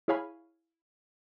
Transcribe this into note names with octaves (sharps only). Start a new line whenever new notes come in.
E4 G#4 C#5 F5 G#5 B5